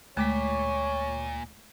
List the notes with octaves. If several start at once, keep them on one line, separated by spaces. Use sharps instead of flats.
D2 A#2 G#3 A3 C#5 D6 B6